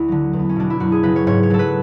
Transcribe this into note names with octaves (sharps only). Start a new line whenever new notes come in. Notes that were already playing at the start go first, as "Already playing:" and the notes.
Already playing: D2 E4
D3 F#3
E2
B3
C#4
B2 F#3 D4
E4
F#2 F#4
G#4
C#3 F#3 B4
C#5
G#2 C#5
C#5
F#3 A4
B4